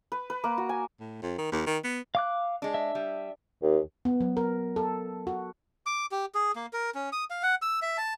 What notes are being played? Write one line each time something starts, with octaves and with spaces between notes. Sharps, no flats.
B4
B4
A#3
F#4
G#5
A2
F2
D#3
D#2
D#3
B3
F5 D6 F#6
G#3 D4
E5
G3
D#2
B3
F#3
A#4
A4
F#4
D6
G4
G#4
A#3
A#4
C#4
D#6
F5
F#5
E6
E5
A5